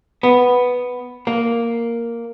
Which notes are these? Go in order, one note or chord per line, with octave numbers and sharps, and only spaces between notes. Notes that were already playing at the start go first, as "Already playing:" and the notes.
B3
A#3